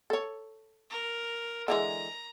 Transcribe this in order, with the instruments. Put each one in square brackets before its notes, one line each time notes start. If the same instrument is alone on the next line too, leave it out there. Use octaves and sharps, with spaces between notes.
[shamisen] A4 C#5
[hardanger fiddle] A#4
[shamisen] D3 E3 G#3 [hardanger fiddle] A#5